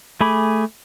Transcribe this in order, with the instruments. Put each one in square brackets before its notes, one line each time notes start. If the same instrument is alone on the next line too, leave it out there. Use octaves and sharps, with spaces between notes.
[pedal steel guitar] A3 G#4 G#5 B5 D6